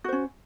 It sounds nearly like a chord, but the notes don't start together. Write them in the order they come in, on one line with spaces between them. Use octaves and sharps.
F#4 C5 C#4